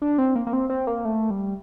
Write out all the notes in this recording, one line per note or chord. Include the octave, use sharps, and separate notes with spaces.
D4
C4
A#3
A#3
C4
C4
A#3
A3
G3